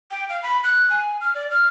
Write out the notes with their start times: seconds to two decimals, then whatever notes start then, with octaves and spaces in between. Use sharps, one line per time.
0.11 G5
0.30 F5
0.43 B5
0.64 F#6
0.90 G#5
1.21 F6
1.35 D5
1.51 F6